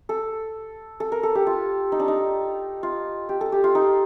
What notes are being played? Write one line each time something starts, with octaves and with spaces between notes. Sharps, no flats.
A4
A4
A#4
A4
G4
F4
D#4
D4
D#4
F4
G4
A4
G4
F4
D#4